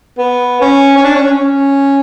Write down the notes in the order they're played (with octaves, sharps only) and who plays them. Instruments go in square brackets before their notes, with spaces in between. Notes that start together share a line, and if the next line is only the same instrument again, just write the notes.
[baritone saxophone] B3
C#4
C#4
D4
C#4
C#4
C#4